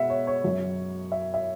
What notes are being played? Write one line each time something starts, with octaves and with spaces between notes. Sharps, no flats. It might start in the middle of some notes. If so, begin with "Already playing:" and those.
Already playing: B2 G#3 E5 F#5
C#5
C#5
F#2 F#3
E5
E5